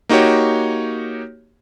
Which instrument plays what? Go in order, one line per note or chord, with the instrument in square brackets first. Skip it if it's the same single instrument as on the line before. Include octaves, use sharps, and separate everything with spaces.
[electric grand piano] A#3 D#4 F#4 G4 C#5